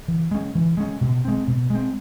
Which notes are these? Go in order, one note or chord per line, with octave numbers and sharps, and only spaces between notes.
E3
G#3 C#4
E3
G#3 C#4
B2
G#3 C4
B2
G#3 C4